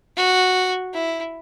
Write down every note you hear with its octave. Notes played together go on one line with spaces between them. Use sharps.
F#4
E4